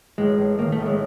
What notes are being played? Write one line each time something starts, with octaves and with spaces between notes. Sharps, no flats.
A1 G#3
A1
D#3 A#3
A3
A1
G#3